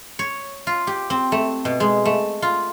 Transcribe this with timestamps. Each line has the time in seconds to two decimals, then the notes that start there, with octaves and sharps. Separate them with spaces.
0.19 C#5
0.67 F4
0.87 G4
1.10 C4
1.32 A3
1.65 B2
1.80 G#3
2.05 A3
2.42 F4